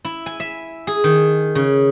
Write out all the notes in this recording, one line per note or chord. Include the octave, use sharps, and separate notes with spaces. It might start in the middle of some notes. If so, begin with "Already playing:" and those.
E4
G#5
E5
G#4
D#3
C#3